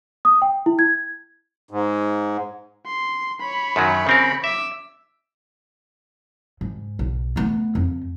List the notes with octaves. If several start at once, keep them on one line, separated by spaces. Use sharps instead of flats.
D#6
G5
E4
G#6
G#2
C6
C#5 B5
F#2 D#3 F#3
C#3 C4 A#4
E5 D6 E6
G#2
B1
A3 B3
F2